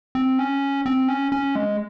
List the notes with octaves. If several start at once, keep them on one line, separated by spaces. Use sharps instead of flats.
C4
C#4
C4
C#4
C#4
G#3